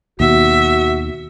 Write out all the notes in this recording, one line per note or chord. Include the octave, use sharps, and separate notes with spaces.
D#2 B2 F#4 E5